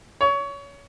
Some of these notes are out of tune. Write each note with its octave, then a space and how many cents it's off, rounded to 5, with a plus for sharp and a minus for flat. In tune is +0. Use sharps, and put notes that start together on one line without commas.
C#5 +25